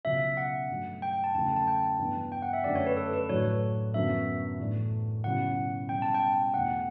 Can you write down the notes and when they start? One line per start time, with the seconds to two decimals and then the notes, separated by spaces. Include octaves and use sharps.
0.04 C#2 B2 F#3 C#4 E5
0.37 F#5
0.70 G2 F#3 A3
1.02 G5
1.13 G5
1.24 A5
1.35 E2 C#3 F#3 A3 A5
1.56 A5
1.67 G5
1.83 A5
1.99 G2 E3 B3
2.32 G5
2.42 F#5
2.53 E5
2.64 F#2 D3 A3 D4 D5
2.75 C#5
2.86 B4
2.97 A4
3.13 B4
3.29 A2 F#3 A3 D4 C#5
3.94 F#2 D3 F#3 B3 E5
4.59 A2 E3 A3 D4
5.24 C#2 B2 F#3 C#4 E4 F#5
5.89 B2 G3 C#4 G5
6.02 A5
6.14 G5
6.54 E2 B2 A3 D4 F#5